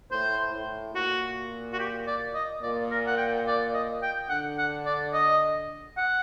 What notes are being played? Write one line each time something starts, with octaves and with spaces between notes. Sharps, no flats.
A2 C5
A2
A#2 F#4
F#4
G4
D5
D#5
A#2 D5
A#4
F#5
G5
D5
D#5
G5
D3 F#5
F#5
D5
D#5
F#5